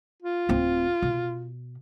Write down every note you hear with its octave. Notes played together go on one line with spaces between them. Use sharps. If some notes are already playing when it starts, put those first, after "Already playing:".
F4
D1 C4
B2